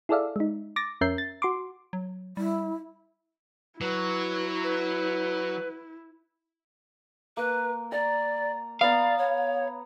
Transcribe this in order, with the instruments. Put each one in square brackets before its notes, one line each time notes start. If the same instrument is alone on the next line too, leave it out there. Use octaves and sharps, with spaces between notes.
[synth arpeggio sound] E4 G#4 A4 D5 E5 F5
G#3 D#4
D6 A6 A#6
F2 C#4 A#4 E5 G6 C7
A6
F#4 C6 D6
[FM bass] F#3
[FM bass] G3 [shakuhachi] E4
[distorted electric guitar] F#3 [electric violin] E4 [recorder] B4
[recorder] B4
[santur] A#3 [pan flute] B4
[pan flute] D5 [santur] A#5
[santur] B3 A#5 [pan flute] D5 [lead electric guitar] F5
[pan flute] C#5